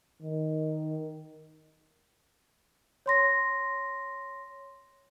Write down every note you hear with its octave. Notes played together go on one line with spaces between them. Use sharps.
D#3
C#5 C6 A#6